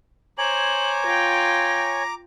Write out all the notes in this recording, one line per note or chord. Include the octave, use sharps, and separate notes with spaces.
C5 C#5 G#5 A#5 D6 F#7
F4 G5 A#6